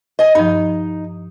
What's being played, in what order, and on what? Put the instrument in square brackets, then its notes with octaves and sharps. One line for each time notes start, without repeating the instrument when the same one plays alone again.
[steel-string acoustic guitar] D#5 G#5
[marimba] G2 F3 [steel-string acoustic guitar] D#4